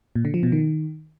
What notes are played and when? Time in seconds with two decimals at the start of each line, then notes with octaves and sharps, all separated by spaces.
0.16 A#2
0.25 D3
0.34 F3
0.43 B2
0.52 D#3